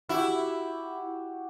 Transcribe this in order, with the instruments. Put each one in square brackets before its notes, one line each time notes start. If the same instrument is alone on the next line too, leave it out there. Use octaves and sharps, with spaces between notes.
[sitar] E4 [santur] F#4 G4